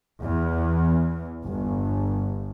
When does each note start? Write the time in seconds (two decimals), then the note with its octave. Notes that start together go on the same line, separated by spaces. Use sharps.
0.22 E2
1.46 G1